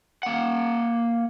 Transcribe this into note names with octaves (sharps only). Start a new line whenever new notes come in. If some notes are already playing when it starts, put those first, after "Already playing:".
A#3 F#5